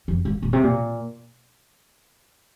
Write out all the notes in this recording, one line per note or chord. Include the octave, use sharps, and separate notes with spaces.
F2
G#2
A#2
C3
A#2